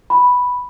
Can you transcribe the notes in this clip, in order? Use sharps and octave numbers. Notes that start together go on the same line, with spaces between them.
B5